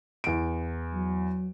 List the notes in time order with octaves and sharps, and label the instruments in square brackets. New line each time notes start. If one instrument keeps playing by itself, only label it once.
[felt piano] E2 D7
[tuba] F#3